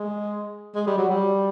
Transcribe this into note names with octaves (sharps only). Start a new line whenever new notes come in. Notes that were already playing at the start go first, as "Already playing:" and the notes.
Already playing: G#3
G#3
G3
F#3
G3